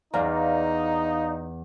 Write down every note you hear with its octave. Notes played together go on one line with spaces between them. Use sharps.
E2 D#4 D5 F5 A#5